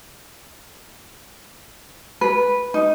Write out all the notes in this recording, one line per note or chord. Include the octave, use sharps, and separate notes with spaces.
B4
D#4